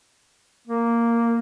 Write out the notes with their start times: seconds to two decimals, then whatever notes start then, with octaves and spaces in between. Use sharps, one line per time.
0.67 A#3